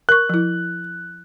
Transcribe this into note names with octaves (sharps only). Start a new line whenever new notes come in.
A#4 C#6 F#6
F3 E4